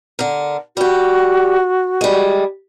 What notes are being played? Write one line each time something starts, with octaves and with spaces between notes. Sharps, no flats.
D3 A#4
G3 F#4 G4
G3 G#3